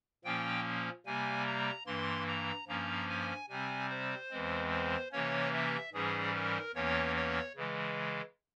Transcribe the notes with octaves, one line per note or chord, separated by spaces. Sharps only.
A#2 F3 A#3 C#4 G5
C3 G3 A#3 G#5
A#5
G2 E3 A#3 C6
A#5
G2 F3 A#3 C#4 A#5
G#5
C3 G3 C4 G#5
C5
E2 E3 G#3 C4
C5
C3 E3 A#3 C#4 C#5
E5
G#2 E3 G3 C#4 G#4
A#4
E2 E3 A#3 C#4 C#5
C#5
C#3 E3 G#3